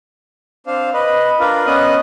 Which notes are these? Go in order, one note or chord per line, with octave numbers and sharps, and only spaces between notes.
C4 D4 C5 F5
B4 D#5
D4 F4 A#4 B4
B3 C#4 D#5 D#6 F#6